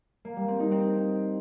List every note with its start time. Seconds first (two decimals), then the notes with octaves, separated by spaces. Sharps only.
0.25 A#3
0.36 G3
0.48 C4
0.60 D#4
0.71 C4